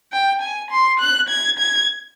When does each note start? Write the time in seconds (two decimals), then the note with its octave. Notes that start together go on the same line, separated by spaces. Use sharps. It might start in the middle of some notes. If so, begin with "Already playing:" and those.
0.12 G5
0.42 G#5
0.71 C6
1.00 F#6
1.29 G#6
1.59 G#6